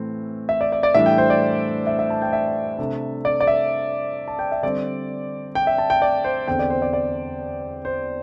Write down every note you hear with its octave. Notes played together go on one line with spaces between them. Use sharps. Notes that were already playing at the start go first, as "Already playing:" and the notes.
Already playing: A2 E3 C4
E5
D5
D5
D5
A2 E3 G3 D4 E5
G5
C5
D5
E5
E5
A5
G5
E5
C3 A3 D4
D5
D5
E5
A5
G5
E5
D3 G3 C4 D5
G5
E5
A5
G5
D5
C5
E2 D3 C4 G5
D5
C5
D5
D5
C5